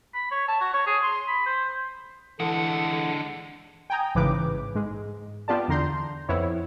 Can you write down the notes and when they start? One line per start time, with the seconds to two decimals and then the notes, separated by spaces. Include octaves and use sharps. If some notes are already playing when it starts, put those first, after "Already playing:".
0.14 B5
0.31 C#5
0.48 A5
0.60 F#4
0.73 C#5
0.87 G#4
1.03 C6
1.28 B5
1.46 C5
2.40 D3 E3 G#3 A4 F#5
3.90 G5 G#5 A#5 D#6
4.15 A1 G#2 C#3 E3 B4 D6
4.75 G#2 G#3
5.48 B3 F4 G4 D5 A5
5.68 E2 D3 A#5 C6 G6
6.29 F2 B3 E4 C#5